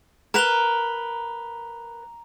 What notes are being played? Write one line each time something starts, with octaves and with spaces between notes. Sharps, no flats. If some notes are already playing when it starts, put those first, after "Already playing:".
A#4 B4 A#5 F7 G7